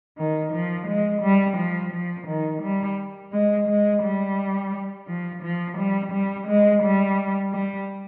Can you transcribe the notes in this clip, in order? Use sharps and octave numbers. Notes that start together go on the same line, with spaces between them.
D#3
F3
G#3
G3
F3
F3
D#3
G3
G#3
G#3
G3
F3
F3
G3
G3
G#3
G3
G3